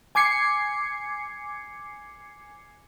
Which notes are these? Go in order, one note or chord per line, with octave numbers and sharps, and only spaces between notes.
G#5 D6 G#6 C7 C#7